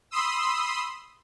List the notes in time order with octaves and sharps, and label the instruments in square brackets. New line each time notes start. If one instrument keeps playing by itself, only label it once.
[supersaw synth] B5 C6 D#6 E6